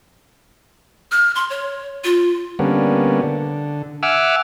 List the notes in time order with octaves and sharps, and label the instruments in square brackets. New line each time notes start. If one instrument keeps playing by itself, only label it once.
[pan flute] F6
C6
C#5
F4
[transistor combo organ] D3 G3 A#3 B3 C#4
D3
E5 F#5 G#5 D6 E6 F6